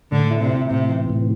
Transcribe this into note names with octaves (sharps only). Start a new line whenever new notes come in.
A2 D3
E4
C3
E4
A2 C3
E3
A2